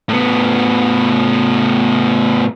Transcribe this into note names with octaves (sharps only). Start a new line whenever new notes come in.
A2 B3